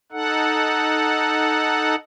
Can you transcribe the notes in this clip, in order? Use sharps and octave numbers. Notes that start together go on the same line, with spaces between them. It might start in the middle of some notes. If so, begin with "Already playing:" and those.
D#4 A4 F#5